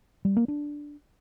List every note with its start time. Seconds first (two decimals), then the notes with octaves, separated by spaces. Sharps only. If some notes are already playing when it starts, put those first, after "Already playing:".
0.25 G3
0.37 A#3
0.48 D4